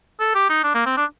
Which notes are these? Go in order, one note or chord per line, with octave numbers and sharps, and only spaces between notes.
A4
G4
D#4
D4
A#3
C4
D4